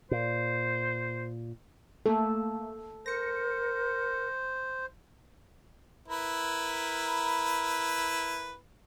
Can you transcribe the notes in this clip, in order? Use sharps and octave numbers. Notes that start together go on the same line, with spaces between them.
A#2 C5
A3 A#3 A4
A#4 C5 A#6 C#7
E4 A#4 B4